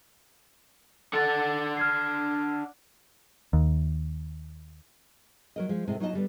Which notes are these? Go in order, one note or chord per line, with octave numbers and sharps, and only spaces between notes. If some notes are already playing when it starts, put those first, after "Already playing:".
D4 A4 F#5 A6
F6 G#6 C7
D#2
F#3 A#4 D#5
F3 G#3
A2 C3 G#3
F#3 D#4 F4 A4 D#5 A5
D3 G3 B3